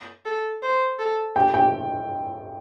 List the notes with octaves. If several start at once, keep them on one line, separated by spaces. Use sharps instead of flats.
A4
C5
A4
G4 G5
G5